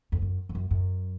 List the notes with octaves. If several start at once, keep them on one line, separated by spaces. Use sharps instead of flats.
F2
F#2
F2
F#2
F#2